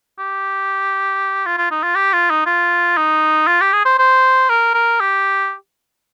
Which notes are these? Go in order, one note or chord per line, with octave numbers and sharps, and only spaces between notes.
G4
F4
F4
D#4
F4
G4
F4
D#4
F4
D#4
F4
G4
G#4
C5
C5
A#4
A#4
G4